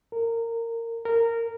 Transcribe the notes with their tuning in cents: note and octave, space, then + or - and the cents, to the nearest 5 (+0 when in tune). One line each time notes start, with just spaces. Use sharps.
A#4 -20
A#4 -15